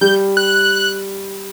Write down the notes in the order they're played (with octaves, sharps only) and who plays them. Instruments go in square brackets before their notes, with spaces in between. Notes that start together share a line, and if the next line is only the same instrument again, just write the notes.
[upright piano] G3 [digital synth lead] G6
[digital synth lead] F#6